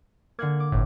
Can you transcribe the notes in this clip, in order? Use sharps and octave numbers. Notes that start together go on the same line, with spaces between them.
D3 A#3 F#5 G#6
D6
G1 A2